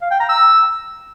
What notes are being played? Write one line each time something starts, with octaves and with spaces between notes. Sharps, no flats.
F5
G5
A#5
E6